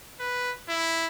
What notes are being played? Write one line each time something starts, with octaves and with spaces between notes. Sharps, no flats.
B4
E4